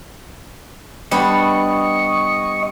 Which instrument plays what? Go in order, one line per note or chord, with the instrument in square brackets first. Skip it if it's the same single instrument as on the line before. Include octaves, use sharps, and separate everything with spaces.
[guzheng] G3 B3 D4 [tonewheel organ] D#5 C#6